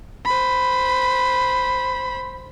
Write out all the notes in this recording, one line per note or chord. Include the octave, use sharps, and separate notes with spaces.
C5 B5